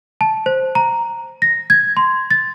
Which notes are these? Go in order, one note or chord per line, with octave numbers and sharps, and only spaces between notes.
A5
C5
A#5
A#6
G#6
C6
A6